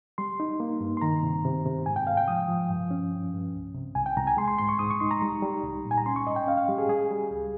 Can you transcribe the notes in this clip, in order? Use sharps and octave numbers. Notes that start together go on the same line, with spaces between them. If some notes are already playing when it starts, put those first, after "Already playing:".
G3 C6
D#4
A#3
G2
C6
D#3 A#5
C3
C3
C3
G#2 G#5
G5
G#2 F5
G5
F3 D#6
F3
G2
C#4
G2
G2
C2
C3
C2 G#5
G5
C2 A#5
G#5
G#3 C6
C6
G#2 C6
C#6
G#2 D#6
C#6
D#4 C6
A#5
G3
G3
C2
A#2
G#5
A#5
C#4 C6
C#6
G#2 D#5
G5
C#4 F5
F5
G3 G4
G#4
G3 G#4
G3
C#2